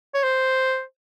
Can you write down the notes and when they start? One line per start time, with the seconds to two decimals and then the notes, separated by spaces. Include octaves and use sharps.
0.14 C#5
0.24 C5